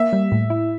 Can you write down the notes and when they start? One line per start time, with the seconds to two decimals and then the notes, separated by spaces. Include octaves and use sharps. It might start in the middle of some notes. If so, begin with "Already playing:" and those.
Already playing: A#3 E5
0.13 G3
0.32 A2
0.50 E4